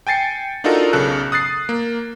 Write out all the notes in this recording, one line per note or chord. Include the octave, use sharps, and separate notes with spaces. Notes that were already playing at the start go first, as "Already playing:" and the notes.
G5 G#5 A6 C7 C#7
D4 D#4 F4 F#4 A4 A#4
B1 C#3 A4 F#6
D#6 F#6 A6 C7
A#3